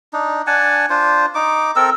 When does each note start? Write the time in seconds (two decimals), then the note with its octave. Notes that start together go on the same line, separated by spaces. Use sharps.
0.13 D4 D#4
0.47 D4 F#5 G#5 A5
0.90 D4 F4 C5
1.35 D#4 D6
1.76 C4 A4 A#4 E6